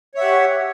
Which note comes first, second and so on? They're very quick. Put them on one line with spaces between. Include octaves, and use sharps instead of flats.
C#5 E5 F#5 G4